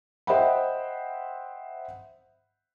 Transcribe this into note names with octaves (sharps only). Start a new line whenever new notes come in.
C5 D#5 E5 F#5 G5 B5